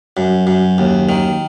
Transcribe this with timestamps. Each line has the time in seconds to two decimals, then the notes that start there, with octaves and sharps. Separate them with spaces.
0.17 F#2
0.47 F#2
0.78 D#2
1.09 D#3